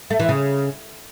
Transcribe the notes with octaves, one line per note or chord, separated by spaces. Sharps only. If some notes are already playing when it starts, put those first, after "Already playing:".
A3
E3
C#3